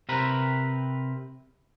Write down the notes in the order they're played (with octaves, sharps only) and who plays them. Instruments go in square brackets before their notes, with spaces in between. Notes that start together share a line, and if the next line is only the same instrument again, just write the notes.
[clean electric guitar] C3 C4 A#4 B4